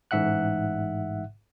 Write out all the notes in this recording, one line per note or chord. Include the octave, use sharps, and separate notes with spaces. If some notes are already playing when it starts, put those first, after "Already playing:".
A1 G#2 E5 F#5 F#6